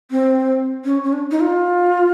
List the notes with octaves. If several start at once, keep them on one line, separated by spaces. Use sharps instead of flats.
C4
C#4
C#4
D4
D#4
F4